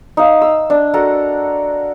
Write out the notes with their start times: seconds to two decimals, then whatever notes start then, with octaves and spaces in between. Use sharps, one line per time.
0.17 D#4 F5
0.41 E6
0.70 D4
0.94 F#4 A4 A#4 F#5